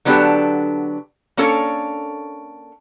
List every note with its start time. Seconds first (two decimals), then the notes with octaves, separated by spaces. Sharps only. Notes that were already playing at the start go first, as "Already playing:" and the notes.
0.05 D3 F#3 B3 D4 G4 A4
1.37 A#3 C#4 D4 A4 C#5